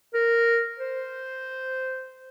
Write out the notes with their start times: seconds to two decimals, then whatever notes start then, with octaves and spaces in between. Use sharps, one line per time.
0.14 A#4
0.79 C5